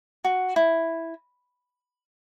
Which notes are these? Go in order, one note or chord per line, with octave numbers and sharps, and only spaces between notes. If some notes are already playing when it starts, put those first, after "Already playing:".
F#4
E4